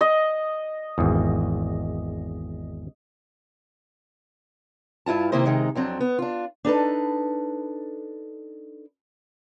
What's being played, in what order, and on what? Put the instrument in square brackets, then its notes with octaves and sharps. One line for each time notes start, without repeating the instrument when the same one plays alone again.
[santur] D#5
[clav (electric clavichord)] G#1 E2
[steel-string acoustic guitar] G2 E4 F4 A5
C3 D#3 A#3 E4 C5 D#5
C3 D#3 G#3 D#4
F2 F#3 C4 D4
B3
D4 F4
D4 D#4 A4 B4